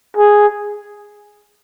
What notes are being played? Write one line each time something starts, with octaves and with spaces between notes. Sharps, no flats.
G#4